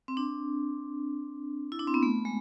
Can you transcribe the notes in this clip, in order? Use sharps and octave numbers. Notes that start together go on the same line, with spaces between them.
C4
D4
E4
D4
C4
B3
A3
G#3